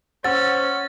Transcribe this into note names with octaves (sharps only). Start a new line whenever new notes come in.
C#4 C5 F#5 E6 A6